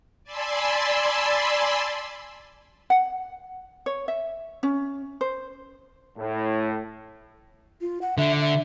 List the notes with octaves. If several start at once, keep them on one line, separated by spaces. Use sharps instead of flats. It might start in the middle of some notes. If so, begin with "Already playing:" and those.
D5 G#5 A5 B5 C6 E6
F#5
C#5
E5
C#4
C5
A2
F4
F#5
D3 E5
E5